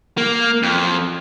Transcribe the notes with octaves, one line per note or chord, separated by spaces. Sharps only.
A#3
F2